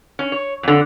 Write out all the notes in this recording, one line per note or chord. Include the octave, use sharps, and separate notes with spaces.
C#4
C#5
F2 D3